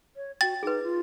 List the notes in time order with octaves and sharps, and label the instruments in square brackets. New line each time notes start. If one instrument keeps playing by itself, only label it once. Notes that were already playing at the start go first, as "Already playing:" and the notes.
[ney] C#5
[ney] F#4 [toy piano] G5 [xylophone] A6
[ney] D#4 [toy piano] G#4 B4
[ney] F4